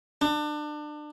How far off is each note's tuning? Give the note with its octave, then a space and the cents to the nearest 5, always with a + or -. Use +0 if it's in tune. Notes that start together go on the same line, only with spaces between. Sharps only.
D4 +30